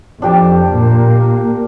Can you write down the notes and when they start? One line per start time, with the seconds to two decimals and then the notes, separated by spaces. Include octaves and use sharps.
0.22 F2 D4 G4 A5
0.72 A#2 A#3